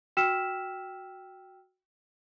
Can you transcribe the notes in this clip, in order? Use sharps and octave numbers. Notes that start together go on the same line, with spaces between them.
F#4 G5 E6 F6 B6 E7